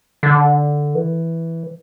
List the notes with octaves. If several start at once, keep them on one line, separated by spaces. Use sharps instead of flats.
D3
E3